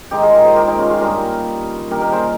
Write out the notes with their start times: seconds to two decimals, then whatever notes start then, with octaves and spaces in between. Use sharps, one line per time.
0.11 G#2 D#3 G#3 D#4 G4
0.22 F4 G#4
0.34 G4 A#4
0.45 G#4 C5
0.56 G4 A#4
0.67 D#4 G4
0.78 C#4 F4
0.89 F4 G#4
1.00 G2 G3 A#3 G4 A#4
1.90 G2 D#3 A#3 G4 A#4
2.01 G4 A#4
2.12 G#4 C5